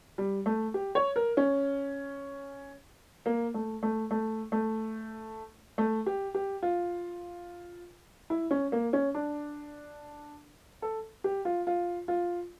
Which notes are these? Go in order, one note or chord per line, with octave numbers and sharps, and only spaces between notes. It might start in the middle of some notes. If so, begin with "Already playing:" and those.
G3
A3
G4
C#5
A#4
C#4
A#3
A3
A3
A3
A3
A3
G4
G4
F4
E4
C#4
A#3
C#4
D4
A4
G4
F4
F4
F4